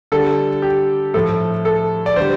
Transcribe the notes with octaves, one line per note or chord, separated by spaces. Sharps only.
D3 G3 A4
G4
A2 F3 A3 A4
A4
D5
D3 G3 C5